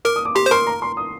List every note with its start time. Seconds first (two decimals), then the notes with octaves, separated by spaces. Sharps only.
0.05 A#4 D6
0.16 D#6
0.25 D6
0.35 G4 C6
0.46 C5
0.51 A#4 C6
0.67 A#5
0.82 C6
0.97 D#6